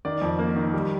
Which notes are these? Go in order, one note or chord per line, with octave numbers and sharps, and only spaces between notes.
D#3 D5
F2
A#3
D#3
G3